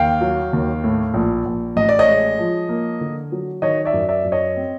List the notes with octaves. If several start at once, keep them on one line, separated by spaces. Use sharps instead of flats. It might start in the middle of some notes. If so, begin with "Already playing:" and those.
Already playing: D#2 F5 G5
F#3
D#2
A2
A#1
A#1
A1 D#5
D5
C#5 D#5
G#3
F3
A#3
D3
F#3
D#3 C#5 D#5
D5 E5
F#2
D5 E5
F#2
C#5 D#5
C4